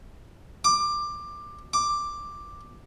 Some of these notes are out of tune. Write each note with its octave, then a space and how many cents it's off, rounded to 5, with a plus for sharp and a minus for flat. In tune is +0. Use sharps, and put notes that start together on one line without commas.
D6 +15
D6 +5